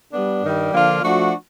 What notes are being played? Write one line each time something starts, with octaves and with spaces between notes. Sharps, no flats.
G3 B3 D4
G2 D#3 G3
D3 F3 A#3 D4 F4
F3 A3 D4 F#4